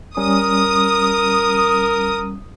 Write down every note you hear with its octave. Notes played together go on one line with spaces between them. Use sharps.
G3 C#4 A#4 D#6